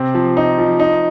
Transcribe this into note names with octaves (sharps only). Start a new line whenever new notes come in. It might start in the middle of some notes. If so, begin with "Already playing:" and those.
Already playing: C3 C4
F3
D#4
F3
D#4